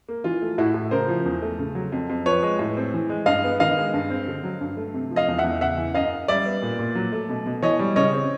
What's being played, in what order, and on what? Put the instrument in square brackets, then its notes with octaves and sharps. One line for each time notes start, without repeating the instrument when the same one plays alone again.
[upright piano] A#3
E3 F4
A3
A2 E4 F#4
A2
C#3 A#4 C5
F3
E2
A3
C#3
F#3
F2
F2
F3 B4 C#5
G#3
A2
C4
E3
G#3
G2 D#5 F5
B3
D#3 D#5 F5
G#3
G2
C4
D3
F#3
G2
A3
C3
F3
D#5 F5
E2
E5 F#5
E2
C#3 E5 F#5
E3
F#2 D#5 F5
F#2
G3 D5 E5
B3
A#2
A#2
F#3
A3
B2
B2
E3 C#5 D#5
G3
C#3 C#5 D#5
C4